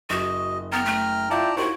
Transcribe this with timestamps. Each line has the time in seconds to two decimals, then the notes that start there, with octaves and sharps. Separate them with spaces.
0.10 F#1 F#4 D#5
0.73 B3 G5 A#5 F6
0.86 A3
1.30 E4 F4 D5 E5 G5 A5 A#5
1.57 D#2 E4 F#4 C5 C#6